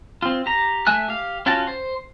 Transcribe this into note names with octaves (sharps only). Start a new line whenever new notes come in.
C4 F4
G4 A#5
A3 E5 G#5 F#6
G4 F5
C#4 F4 F#4 G5 A5
C5